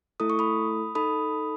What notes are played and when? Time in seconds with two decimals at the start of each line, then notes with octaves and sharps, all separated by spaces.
0.20 A3 E4 A4 D#6
0.30 C#6
0.39 B5 D#6
0.95 D#4 A4 B5 D#6